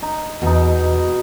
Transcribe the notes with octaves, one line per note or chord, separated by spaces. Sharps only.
D#4
E2 B2 D#4